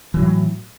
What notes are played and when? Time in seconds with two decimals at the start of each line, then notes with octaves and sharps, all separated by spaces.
0.14 E3
0.17 F#3
0.20 A2